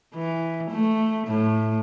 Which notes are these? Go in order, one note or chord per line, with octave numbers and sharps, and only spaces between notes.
E3
A3
A2